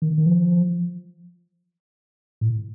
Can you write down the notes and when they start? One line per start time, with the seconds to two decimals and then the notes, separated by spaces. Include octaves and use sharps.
0.02 D#3
0.18 D#3
0.26 F3
2.41 A2